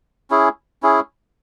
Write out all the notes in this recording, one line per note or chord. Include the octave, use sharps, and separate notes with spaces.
C#4 E4 G#4
C#4 E4 G#4